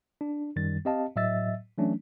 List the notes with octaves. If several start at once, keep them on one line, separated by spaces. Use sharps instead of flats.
D4
F#2 D#3 G3 A6
C4 G4 D#5 F5 A5
A2 F#3 D#5 E5 E6 A6
E3 F#3 A3 C#4 D4